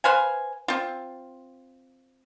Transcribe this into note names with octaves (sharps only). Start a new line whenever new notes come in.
B4 C5 F5 G#5
C4 F4